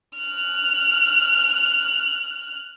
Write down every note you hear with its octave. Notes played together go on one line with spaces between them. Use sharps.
F6 F#6